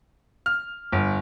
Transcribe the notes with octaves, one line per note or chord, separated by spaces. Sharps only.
F6
G1